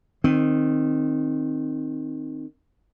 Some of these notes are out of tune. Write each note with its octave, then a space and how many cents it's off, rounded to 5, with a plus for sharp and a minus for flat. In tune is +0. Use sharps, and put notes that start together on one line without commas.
D#3 -15 C4 +0